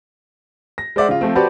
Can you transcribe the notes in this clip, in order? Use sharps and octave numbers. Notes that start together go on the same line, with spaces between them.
A#6
G#3 C5 D5 E5 F#5
C#3 F4
F3 A3 C4
F#4 G4 B4 C5 D5 A5